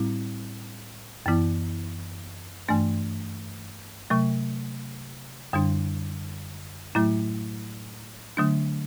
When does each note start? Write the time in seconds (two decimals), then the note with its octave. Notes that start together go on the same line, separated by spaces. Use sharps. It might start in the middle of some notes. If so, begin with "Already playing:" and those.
Already playing: A2 G3 C4 E4
1.26 F#2 E3 B3 E4
2.68 G2 E3 A3 D4
4.10 C3 F#3 A3
5.53 F#2 D3 G3 D4
6.95 A2 F#3 A3 E4
8.37 D3 F#3 A3 D4